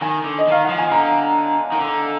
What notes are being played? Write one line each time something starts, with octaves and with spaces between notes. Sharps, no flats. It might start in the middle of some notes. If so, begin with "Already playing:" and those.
D#3 G#5
D3
D#5
D#3 F5
F3 F#5
G#5
D3 A#5
D#3
D3